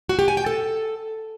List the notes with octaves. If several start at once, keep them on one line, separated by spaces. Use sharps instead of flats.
F#4
G4
G#5
G5
A4